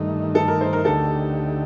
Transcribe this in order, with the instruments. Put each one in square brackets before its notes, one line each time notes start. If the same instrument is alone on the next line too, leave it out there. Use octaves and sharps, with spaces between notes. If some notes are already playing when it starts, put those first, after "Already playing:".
Already playing: [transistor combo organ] G2 D#3 A3 D#4
[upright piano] A4
A#4
C5
A#4
[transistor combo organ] D2 D3 A3 D#4 G4 [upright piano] A4